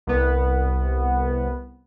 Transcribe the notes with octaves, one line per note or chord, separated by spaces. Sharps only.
C2 B3